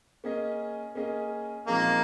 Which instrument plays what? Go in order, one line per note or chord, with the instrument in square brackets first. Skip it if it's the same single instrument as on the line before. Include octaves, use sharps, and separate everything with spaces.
[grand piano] A#3 C#4 G#4 D#5
A#3 C#4 G#4 D#5
[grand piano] A#2 F3 G#3 C4 D#4 [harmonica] A#3